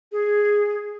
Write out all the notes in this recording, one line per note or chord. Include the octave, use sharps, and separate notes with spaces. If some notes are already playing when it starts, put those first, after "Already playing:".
G#4